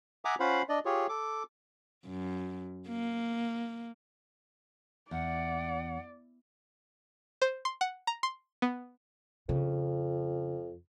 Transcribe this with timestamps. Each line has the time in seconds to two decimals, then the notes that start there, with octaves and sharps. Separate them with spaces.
0.25 E5 F#5 G#5 A#5 D6 D#6
0.40 C#4 F4 C5 F5 F#5 B5
0.69 D4 D5 D#5
0.85 F4 G4 G#4 C#5
1.09 A4 D6
2.06 F#2
2.88 A#3
5.11 E2 D5 F#5
7.42 C5
7.65 C6
7.81 F#5
8.07 A#5
8.23 C6
8.62 B3
9.49 F2 C#3